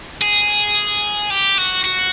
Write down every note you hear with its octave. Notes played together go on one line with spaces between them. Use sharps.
G#4
G4
F#4
F#4